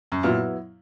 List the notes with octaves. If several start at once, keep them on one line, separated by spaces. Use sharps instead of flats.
F#2
A#2 F#3 B3 E4